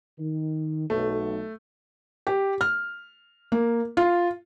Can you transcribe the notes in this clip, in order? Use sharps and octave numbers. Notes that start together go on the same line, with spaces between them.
D#3
B1 A3
G4
F6
A#3
F4